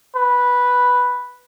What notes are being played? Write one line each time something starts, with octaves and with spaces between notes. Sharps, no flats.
B4